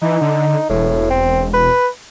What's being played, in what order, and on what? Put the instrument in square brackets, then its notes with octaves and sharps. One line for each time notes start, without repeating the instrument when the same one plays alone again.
[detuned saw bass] E3 [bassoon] D#4
[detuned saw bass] D3
[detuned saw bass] E1 [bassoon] A2
[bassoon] C4
B4